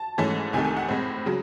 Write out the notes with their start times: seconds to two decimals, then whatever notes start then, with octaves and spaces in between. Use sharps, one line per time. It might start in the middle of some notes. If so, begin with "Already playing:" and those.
Already playing: A5
0.18 G#2 E3 A3 C#4
0.53 C2 C3 D#3 A3 G#5
0.65 G#5
0.77 F#5
0.88 A2 G#3 C4
1.26 C#3 F#3